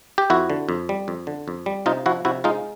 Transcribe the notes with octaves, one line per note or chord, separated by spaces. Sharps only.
G4
F2 E4 F#4
D3
F2
G3
F2
D3
F2
G3
C3 D#4 F4
F3 E4 F#4
C3 E4 F#4
G#3 D#4 F4